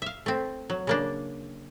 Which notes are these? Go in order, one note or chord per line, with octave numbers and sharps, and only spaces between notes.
E5 F5
A3 C4
F#3
C#3 A#3 D4